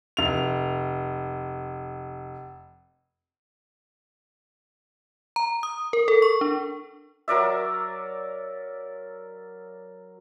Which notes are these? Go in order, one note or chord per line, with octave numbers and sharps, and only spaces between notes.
F1 F7
A#5
D#6
A#4
A4
C#6
D4
F#3 A#4 D5 E5